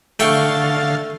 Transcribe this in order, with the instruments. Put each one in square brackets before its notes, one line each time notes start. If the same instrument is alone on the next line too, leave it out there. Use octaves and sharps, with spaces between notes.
[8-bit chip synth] D3 F5 A6 [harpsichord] A3 G5 C#6